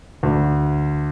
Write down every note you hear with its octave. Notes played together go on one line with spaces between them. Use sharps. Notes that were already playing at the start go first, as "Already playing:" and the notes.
D2